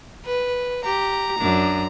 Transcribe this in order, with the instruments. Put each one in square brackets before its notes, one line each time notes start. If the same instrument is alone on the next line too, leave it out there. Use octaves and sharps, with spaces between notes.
[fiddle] B4
[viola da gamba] G4 [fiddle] A#5
[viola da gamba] F#2 D4